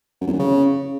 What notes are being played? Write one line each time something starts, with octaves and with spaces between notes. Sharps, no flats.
F#2
E2
F#2
C#3